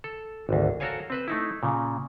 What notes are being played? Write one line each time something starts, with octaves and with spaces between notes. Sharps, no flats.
A4
G#1 D2
F#4 A4 A#4 C#5 F5 G#5
C4 B4 C5
A3 D#4 E4
A#2 C#3